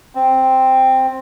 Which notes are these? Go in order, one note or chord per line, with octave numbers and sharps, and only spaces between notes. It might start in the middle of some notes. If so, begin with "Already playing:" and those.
C4